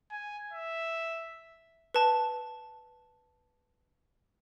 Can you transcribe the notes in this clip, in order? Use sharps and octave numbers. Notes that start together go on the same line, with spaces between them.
G#5
E5
B4 A5